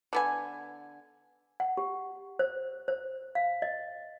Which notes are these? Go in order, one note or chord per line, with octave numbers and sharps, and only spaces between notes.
D3 B3 G#5
F#5
G4
C5
C5
F5
D#5